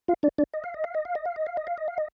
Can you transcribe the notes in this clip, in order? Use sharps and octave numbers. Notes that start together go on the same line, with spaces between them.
F4 F5
D4 D5
D4 D5
D#5
F5
D#5
F5
D#5
F5
D#5
F5
D#5
F5
D#5
F5
D#5
F5
D#5